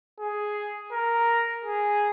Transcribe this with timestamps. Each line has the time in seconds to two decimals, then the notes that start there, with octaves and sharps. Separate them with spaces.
0.19 G#4
0.92 A#4
1.65 G#4